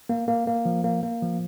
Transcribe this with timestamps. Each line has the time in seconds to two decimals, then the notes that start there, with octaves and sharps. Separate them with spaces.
0.09 A#3
0.28 A#3
0.47 A#3
0.65 F3
0.84 A#3
1.03 A#3
1.22 F3